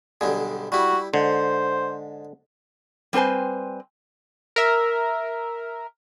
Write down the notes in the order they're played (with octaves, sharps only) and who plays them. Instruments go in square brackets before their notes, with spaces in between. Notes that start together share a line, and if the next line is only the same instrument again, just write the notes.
[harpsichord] B1 G2 D3 [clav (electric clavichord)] G#4
[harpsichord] G3 E4 [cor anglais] F#4
[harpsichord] G#2 [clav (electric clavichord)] D3 [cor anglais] C5
[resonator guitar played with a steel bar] G3 C4 B4 C5 G#5
[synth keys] A#4 E5